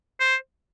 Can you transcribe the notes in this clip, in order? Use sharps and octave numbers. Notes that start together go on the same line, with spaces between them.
C5